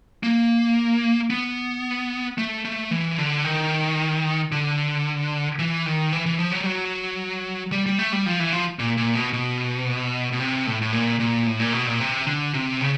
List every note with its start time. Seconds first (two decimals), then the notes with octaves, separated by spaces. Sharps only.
0.23 A#3
1.30 B3
2.38 A3
2.65 A3
2.91 E3
3.18 D3
3.44 D#3
4.52 D3
5.59 E3
5.86 D#3
6.13 E3
6.26 E3
6.38 F3
6.52 F#3
6.60 G3
6.66 F#3
7.72 G3
7.86 G3
7.99 A3
8.12 G3
8.26 F3
8.40 E3
8.53 F3
8.79 A#2
8.97 A#2
9.15 B2
9.33 B2
10.32 B2
10.40 C3
10.67 A2
10.82 A2
10.93 A#2
11.20 A#2
11.47 A2
11.59 A#2
11.73 B2
11.86 A#2
12.00 C3
12.27 D3
12.54 C3
12.81 C#3